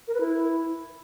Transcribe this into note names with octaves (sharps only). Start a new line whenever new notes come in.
A#4
B4
E4